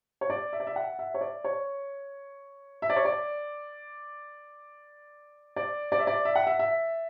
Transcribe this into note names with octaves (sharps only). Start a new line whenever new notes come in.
C#5
D5
E5
D5
E5
F#5
E5
C#5
D5
C#5
E5
D5
C#5
D5
D5
D5
E5
D5
E5
F#5
E5
E5